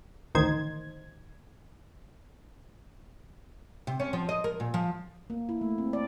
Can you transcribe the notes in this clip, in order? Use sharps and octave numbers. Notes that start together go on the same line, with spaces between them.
A1 D2 D#3 D#4 C5 G#6
C3
C#4
F3
D#5
A#4
A#2
F3
A#3
E4
A3
C4
D5